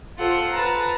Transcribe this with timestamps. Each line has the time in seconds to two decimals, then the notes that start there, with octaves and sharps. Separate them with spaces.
0.18 F4 A4 C5 F#5
0.50 B4 A5 A#5